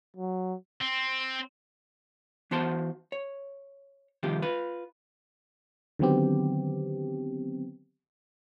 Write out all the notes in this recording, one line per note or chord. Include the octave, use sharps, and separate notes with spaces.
F#3
C4
E3 B3 F#4 C5 A5 C6
C#5
G2 C3 D#3 F3 F4 G4
F4 B4
D3 D#3 F#3 B3 C4 G4